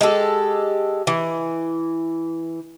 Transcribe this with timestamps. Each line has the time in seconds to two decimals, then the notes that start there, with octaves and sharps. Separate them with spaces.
0.01 G#3 G4 A4
1.07 E3